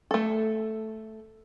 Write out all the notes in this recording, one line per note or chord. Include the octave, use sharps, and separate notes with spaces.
A3 A4